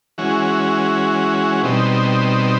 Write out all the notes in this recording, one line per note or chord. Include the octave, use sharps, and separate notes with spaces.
E3 G#3 C#4 F#4
B2 G3 C4 D#4